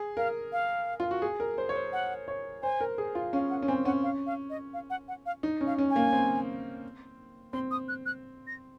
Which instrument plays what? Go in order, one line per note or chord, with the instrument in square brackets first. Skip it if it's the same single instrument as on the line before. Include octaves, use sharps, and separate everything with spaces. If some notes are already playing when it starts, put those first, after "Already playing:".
Already playing: [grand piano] G#4
[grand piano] A#4 [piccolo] F5
[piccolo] F5
[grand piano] F4
F#4
G#4
A#4
C5
C#5
C5
[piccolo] F#5
[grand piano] C#5
[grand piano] C5 [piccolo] G#5
[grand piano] A#4
G#4
F4
[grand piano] C#4 [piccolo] F5
[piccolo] F#5
[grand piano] C#4
[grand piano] C4 [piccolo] G#5
[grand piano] C#4 [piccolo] F#5
[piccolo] F5
F5
D#5
F5
F#5
F#5
F5
[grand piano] D#4
C#4
[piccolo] F5
[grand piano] C#4
[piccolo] G#5
[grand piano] A#3
C4
[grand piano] C4 [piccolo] C6
[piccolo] D#6
F#6
F#6
A#6